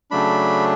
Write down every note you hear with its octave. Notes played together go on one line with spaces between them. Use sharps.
C#3 F#3 A3 D4 B5